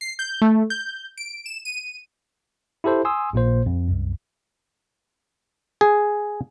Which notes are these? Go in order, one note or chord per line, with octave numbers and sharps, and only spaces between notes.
C7
G6
A3
G6
D7
E7
D#7
E4 G4 A4 C5
G#5 C6 D#6 E6
A#1 A#2 A#3 C5
F2
C2 F#2
G#4